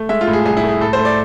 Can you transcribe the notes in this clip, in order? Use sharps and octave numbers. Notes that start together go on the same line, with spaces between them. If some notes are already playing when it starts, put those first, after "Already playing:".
Already playing: A3
G#3 E5
F4
A2
G#4
C2 G#4
E4
A3
G#4
A2 A4
C5
A3
D5